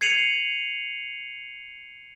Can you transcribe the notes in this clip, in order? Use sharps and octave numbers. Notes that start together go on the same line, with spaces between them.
G#6 C7 C#7 D#7 F7 F#7